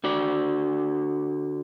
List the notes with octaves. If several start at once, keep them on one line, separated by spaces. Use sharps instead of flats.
D3 F#4 D5